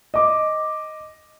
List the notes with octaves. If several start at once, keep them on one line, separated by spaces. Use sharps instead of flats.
D#5 D6